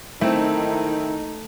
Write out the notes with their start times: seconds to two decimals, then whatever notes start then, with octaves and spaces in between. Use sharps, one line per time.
0.21 D#3 A3 C4 D#4 E4